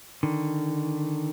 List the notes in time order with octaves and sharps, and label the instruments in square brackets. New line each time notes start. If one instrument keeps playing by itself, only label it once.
[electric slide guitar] D3 D#3